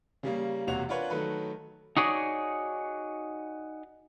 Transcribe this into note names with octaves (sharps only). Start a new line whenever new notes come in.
C#3 G3 A#3 C#4
E1 C3 A#3 F#4 C#5 F7
D4 F4 A#4 B4 C#5 F#5
D#3 F#3 A3 A4 B4
D#4 F#4 G#4 C#5 D5